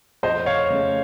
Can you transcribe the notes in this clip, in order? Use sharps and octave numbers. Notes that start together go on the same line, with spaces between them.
F2 C5 D#5
C#5 F5
C#3 A3